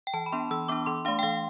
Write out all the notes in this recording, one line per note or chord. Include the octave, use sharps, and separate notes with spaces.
G5
E3 A5
B5
B3 D4 C6
E3 E6
B3 D4 D6
E3 C6
A3 D4 F5
G5
E3 F5